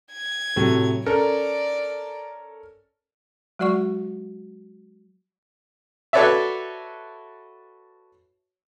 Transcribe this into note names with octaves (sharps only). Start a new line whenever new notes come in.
G#6
A2 C3 F#3
C#4 A4 A#4 D5
F#3 G#3 F#4 D5 F#5 C#6
F#4 A4 B4 C#5 D5 E5